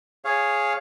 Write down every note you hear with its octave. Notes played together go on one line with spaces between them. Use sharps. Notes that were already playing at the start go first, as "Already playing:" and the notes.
G#4 C#5 F5